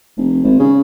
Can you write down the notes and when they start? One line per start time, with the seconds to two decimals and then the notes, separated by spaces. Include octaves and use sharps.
0.17 F1
0.43 G#1
0.59 C#3